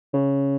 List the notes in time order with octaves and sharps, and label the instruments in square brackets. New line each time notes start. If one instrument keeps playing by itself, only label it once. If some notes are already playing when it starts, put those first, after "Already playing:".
[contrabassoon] C#3